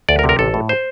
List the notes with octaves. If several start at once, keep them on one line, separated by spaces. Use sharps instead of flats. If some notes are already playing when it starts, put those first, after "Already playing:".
D2 D5
A#4
C3
A#4
A1 A4
A2
C5